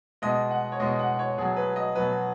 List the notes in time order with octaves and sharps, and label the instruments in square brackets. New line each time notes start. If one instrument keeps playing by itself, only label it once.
[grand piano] B2 G#3 D#5
F#5
C#5
B2 G#3 D#5
F#5
C#5
B2 F#3 G#4
B4
D#5
B2 F#3 B4